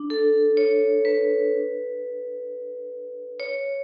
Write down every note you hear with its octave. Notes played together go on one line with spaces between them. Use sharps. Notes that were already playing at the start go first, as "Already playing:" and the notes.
Already playing: D4
A4
C#5
B4
C#5